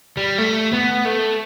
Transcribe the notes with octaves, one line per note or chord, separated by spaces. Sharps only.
G3
A3
B3
A3